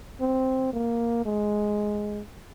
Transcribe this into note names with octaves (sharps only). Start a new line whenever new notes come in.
C4
A#3
G#3